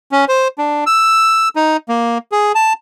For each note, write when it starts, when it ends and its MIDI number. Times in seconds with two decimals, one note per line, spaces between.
0.12 0.25 61
0.28 0.48 72
0.58 0.84 62
0.86 1.49 88
1.56 1.77 63
1.89 2.18 58
2.32 2.52 68
2.55 2.73 81